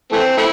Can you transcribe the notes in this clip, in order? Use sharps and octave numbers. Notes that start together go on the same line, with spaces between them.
E3 A3 C4
A3 C4 E4